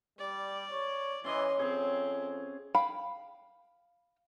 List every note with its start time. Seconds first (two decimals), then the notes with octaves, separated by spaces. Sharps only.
0.19 G3 D5
0.71 C#5
1.24 E3 C#4 D#5 E5 C6 D6
1.59 F2 C4 G#4 C#5
2.75 F5 G5 B5